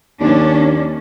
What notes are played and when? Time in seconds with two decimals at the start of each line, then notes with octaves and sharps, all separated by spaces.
0.20 D#2 C#4 D4